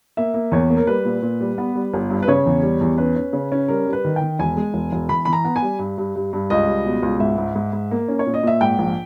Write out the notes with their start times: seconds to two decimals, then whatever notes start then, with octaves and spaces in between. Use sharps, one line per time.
0.17 A#3 E5
0.34 A#3
0.52 E2 C#5
0.70 A#3
0.77 A#4
0.87 G3 B4
1.05 A#2
1.22 A#2
1.41 G3
1.58 B3
1.75 G3
1.93 G1
2.10 G2
2.23 B4
2.28 C#3 C#5
2.46 E2
2.63 G3
2.81 E2
2.98 C#4 B4
3.16 C#4
3.33 C#3
3.52 C#4
3.68 G3 A#4
3.86 G3
3.93 B4
4.04 D#3
4.16 G5
4.21 D#3
4.39 E1 G#5
4.57 G#3
4.74 E1
4.92 E1
5.09 E3 B5
5.25 E3 B5
5.33 A#5
5.45 B3
5.56 G#5
5.62 G3
5.79 G2
5.98 G2
6.15 G2
6.33 G2
6.50 C#2 D#5
6.67 G3
6.85 B2
7.03 C#2
7.20 G#2 E5
7.38 G#2
7.55 G#2
7.73 G#2
7.91 A#3
8.08 C#4
8.19 C#5
8.26 A#2
8.34 D#5
8.43 A#2 E5
8.61 G#2 G5
8.78 A#1